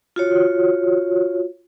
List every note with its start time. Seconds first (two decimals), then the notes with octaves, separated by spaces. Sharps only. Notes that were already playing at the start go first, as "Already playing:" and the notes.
0.16 F4 F#4 C#5